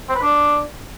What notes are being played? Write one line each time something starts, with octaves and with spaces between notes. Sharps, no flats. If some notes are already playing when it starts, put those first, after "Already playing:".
C4
B4
D4